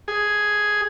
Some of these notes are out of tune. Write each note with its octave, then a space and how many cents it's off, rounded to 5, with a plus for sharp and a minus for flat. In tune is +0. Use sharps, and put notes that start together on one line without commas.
G#4 +5